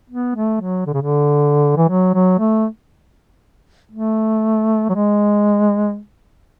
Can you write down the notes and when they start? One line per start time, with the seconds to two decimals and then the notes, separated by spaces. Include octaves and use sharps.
0.10 B3
0.36 A3
0.61 F#3
0.87 D3
0.94 C#3
1.02 D3
1.77 E3
1.89 F#3
2.14 F#3
2.39 A3
3.92 A3
4.90 F#3
4.94 G#3